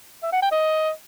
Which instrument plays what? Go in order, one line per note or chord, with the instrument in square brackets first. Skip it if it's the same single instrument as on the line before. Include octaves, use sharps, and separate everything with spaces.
[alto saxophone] E5
F#5
G5
D#5